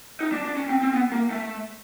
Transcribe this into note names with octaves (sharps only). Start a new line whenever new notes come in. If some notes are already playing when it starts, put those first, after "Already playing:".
D#4
D4
D4
C#4
C4
C4
B3
A#3
A3